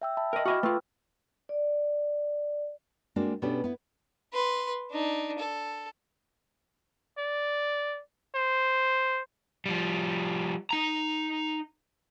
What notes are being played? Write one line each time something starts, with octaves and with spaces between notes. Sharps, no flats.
E5 G5 E6
E5 A5 B5
A#4 D#5 G5
F#4 D#5 E5 B5 D6 F6
A3 F4 B4 G5 E6
D5
G#3 A#3 C4 D4 F#4
B2 B3 C#4 D4 G4 A4
B3 E4
B4 C6
D4 D#4
A4
D5
C5
F3 G3
D#4 A#5